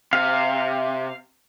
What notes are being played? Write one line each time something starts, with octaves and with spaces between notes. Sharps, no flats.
C3 F5